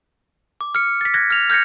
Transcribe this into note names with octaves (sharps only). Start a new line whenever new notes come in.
D6
F6 C#7
A6 B6
F#6 G#6 A#6
F6 F7
F6 G6 G#6 A#6 C#7